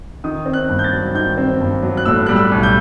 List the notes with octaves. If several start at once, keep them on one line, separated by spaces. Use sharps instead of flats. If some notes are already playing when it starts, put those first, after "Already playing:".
D#3 D#6
C4
F#6
G2
G6
A6
F#3
D#3 G6
C4
G2
F#3
F#6
A2 E6
G3 F#6
E6
B1
G6